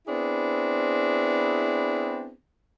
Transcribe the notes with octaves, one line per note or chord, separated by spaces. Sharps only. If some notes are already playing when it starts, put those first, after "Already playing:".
B3 C4 D4 E4 G#4